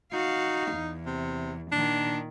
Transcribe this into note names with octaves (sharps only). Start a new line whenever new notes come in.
D#4 F#4 F5
E2
C3
A#2 D#3 D4